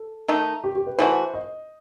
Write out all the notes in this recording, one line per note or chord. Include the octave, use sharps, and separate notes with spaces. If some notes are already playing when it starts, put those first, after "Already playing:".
Already playing: A4
D#3 A3 D#4
G4
G4
B4
E3 A3 D#4 F#4 C5
D#5